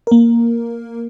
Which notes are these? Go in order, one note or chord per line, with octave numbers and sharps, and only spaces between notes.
A#3 A#4